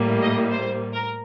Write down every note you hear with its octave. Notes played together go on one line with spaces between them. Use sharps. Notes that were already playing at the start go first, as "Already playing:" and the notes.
Already playing: A2 G3 A#3
D#5
C5
A#4